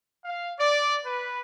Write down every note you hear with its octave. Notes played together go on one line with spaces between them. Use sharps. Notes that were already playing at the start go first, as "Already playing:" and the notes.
F5
D5
B4